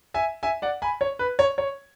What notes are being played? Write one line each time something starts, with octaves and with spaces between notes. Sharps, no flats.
E5 G#5
E5 G#5
D5 F#5
G#5 B5
C#5
B4
C#5
C#5